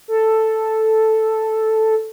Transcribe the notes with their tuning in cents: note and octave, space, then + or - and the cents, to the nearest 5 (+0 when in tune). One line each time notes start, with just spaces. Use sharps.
A4 +0